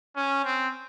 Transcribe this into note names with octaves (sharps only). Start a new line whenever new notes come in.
C#4
C4